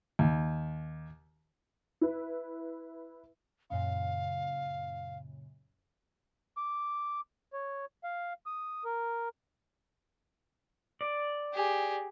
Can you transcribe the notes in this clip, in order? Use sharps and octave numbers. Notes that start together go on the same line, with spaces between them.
D#2
E4 B4
F#2 A#2 C#3 F5
D6
C#5
F5
D#6
A#4
D5
G4 G#4